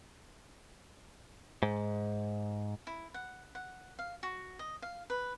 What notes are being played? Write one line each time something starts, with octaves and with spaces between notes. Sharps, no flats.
G#2
E4
F#5
F#5
F5
F#4
D#5
F5
B4